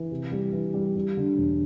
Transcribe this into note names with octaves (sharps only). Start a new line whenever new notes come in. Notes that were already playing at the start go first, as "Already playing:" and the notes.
Already playing: E3
C3
G3
E3
G3
G3
D3
E1